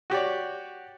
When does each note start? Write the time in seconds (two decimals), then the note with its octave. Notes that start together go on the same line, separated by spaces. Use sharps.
0.10 F#4 G4 C#5 D5